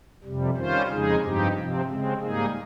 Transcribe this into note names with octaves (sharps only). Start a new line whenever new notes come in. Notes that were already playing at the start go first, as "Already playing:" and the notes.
F2 C3 G3
D#3 G3 C#4 F4 C5
F2 C#3 G#3 D#4 G#4
G2 F3 C4 D#4 G4
C3 F3 C4
C#3 G#3 C4
G#2 G3 A#3 D#4 G#4